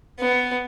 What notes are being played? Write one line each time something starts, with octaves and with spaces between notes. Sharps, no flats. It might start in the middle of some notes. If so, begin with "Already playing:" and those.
B3